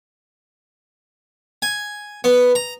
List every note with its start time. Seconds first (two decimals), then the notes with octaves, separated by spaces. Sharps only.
1.62 G#5
2.24 B3
2.55 A#5